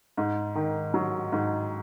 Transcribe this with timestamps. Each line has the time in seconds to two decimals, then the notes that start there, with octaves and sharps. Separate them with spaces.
0.17 G#2
0.55 D#3
0.94 F#3
1.32 G#2